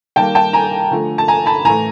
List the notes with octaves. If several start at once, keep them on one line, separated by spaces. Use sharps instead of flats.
D#3 G3 A#3 G5 A5
G5 A5
G#5 A#5
D3 F3 A3
A5
G#5 A#5
A5 B5
A2 E3 A3 G#5 A#5